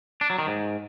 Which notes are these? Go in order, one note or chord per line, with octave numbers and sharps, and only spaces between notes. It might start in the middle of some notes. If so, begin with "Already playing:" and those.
D4
F#3
D#3
G#2